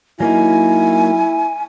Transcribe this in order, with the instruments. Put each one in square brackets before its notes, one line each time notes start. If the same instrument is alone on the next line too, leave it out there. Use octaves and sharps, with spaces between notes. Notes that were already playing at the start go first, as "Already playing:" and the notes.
[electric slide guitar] F#3 A#3 D#4 [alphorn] E4 [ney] G#5